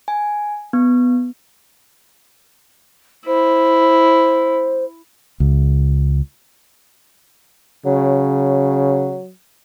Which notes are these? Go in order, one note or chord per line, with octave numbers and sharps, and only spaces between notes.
G#5
B3
E4 C5
C#2
C#3 F#3